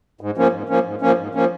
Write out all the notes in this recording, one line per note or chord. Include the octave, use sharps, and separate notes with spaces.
G#2
F3 A#3 C#4
G#2
F3 A#3 C#4
G#2
F3 A#3 C#4
G#2
F3 A#3 C#4